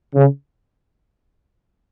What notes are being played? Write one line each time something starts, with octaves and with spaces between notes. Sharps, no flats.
C#3